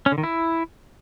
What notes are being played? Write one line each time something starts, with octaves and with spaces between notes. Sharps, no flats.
C#4
D3
D#3
E4